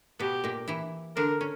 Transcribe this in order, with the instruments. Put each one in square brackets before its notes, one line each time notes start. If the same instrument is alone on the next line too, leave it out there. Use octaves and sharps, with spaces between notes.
[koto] B2 B3 [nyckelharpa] G4
[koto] A#2 A#3
E3 E4
[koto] D3 D4 [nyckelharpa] A#4
[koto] C#4